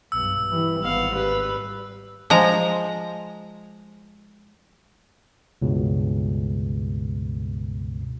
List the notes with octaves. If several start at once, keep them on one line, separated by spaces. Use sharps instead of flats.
B1 G2 E6
E3 G3
G#1 B3 F5
G3 B4
F3 G#3 A#5
C#2 G2 B2